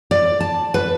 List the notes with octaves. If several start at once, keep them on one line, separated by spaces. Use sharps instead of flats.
D5
A5
B4